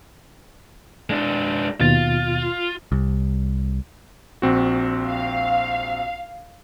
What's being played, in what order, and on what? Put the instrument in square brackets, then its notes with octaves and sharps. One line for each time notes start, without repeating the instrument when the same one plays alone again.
[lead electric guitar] G#3 D4
[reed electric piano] D#2 B2 A6 [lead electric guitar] F4
[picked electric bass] C2
[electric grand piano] A#1 C4 F#4
[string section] F5